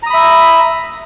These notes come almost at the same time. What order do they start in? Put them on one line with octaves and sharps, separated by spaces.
A#5 D#6 B5 E5